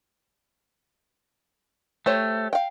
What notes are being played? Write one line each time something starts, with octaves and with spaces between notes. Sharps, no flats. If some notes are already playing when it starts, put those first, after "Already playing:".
A3 G4 C5 C#5
F5 G5